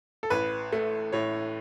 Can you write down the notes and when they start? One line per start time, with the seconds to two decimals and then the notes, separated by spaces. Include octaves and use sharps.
0.23 A4
0.30 A1 B4
0.73 A3
1.12 A2 C#5